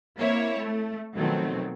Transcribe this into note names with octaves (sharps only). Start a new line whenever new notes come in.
A#3 C4 E4 C#5
A3
B2 D#3 F3 F#3 A3 C4